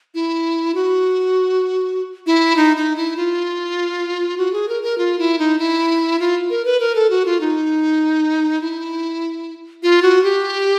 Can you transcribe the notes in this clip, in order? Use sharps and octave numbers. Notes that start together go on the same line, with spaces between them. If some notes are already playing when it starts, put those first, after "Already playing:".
E4
F#4
E4
D#4
D#4
E4
F4
F#4
G#4
A#4
A#4
F4
E4
D#4
E4
F4
A#4
B4
A#4
A4
F#4
F4
D#4
E4
F4
F#4
G4